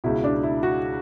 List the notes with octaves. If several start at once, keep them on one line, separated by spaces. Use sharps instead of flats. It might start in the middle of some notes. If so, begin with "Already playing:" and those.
C#2 B2 E4
D4
E4
F#4